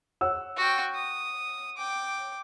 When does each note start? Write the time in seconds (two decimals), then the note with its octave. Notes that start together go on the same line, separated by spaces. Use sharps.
0.21 C#5 F#5 E6
0.57 F#4 G5
0.94 D#6
1.77 G5 D6